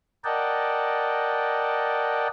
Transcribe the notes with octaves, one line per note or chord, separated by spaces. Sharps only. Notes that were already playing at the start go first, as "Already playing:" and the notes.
A#4 D5 D#5 F#5 G5 A5